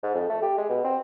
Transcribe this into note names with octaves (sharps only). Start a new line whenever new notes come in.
G#2
F2
A3
G4
G#3
B2
C4